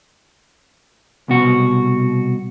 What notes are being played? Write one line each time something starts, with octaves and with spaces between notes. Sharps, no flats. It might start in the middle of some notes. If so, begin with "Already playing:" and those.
C2 B2 F#4